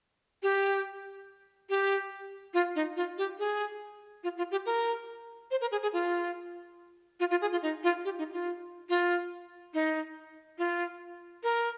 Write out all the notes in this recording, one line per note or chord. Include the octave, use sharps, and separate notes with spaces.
G4
G4
F4
D#4
F4
G4
G#4
F4
F4
G4
A#4
C5
A#4
G#4
G#4
F4
F4
F4
G#4
F4
D#4
F4
G4
D#4
F4
F4
D#4
F4
A#4